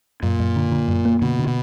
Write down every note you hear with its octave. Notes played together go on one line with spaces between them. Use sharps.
F#2 A#2
F#2
D3
D3
F#2
A#3
B2 D3
D3
B2